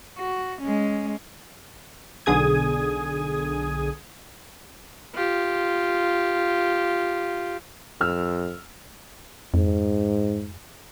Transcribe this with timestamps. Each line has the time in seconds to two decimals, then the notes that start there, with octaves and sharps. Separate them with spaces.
0.19 F#4
0.62 G#3 C#4
2.26 B1 D3 G#4 D#6 G#6
5.14 F4 G4
8.01 F2 E6 F6
9.54 F2 G#2